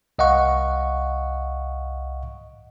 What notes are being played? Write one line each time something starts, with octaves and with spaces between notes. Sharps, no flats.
C2 D#5 F5 F#5 C#6